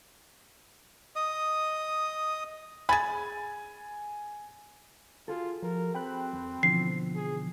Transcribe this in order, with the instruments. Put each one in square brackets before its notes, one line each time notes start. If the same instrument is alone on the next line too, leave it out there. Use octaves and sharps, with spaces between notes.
[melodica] D#5 D#6
[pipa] G#4 B5 [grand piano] G#5 A6
[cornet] F4 [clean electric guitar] F#4 G#4 A4
[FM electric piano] F3 [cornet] A#4
[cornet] C4 [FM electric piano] G5 B5 F#6
[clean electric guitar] F2
[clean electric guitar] B2 D3 [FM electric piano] E3 F3 [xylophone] C7
[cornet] G#4